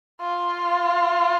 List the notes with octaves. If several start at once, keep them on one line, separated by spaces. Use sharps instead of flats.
F4